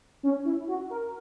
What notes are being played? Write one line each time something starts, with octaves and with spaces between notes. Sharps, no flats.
C#4
E4
F#4
A#4